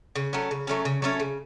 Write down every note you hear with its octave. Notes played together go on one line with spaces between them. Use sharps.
C#3
F#3 A3 C#4
C#3
F#3 A3 C#4
C#3
F#3 A3 C#4
C#3